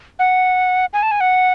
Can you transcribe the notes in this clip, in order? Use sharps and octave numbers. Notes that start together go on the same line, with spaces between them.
F#5
G#5
A5
G#5
F#5